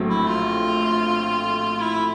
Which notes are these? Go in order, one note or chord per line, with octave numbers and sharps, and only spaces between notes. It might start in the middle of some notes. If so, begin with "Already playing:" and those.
Already playing: A#1 A2 F#3 A3 C4
E4
F4
E4